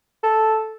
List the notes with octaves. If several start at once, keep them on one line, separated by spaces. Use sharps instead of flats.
A4